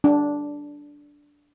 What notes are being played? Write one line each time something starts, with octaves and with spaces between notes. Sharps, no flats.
D4